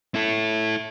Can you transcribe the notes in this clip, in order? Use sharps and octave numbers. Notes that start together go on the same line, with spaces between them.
E4 A4